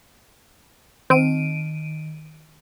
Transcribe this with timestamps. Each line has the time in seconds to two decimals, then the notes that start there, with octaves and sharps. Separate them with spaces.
1.10 D#3 C4 D7 D#7